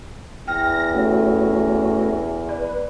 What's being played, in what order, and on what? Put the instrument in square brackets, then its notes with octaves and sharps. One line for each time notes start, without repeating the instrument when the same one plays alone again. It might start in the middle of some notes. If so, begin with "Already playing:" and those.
[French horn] E2 [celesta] G5 F6 [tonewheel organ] A#6
[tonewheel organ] A3 C#4 F#4
[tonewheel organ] B4 [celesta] D5